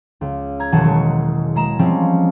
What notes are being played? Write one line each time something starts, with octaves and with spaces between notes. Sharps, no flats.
C#2
A#5 G#6
E1 D#3 F#3 G#4 F#5 A5
F#3 G#3
G#3 A#5 E7
F3 G3 G#3 C4 C#4